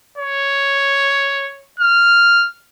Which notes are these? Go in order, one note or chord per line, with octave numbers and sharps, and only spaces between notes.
C#5
F6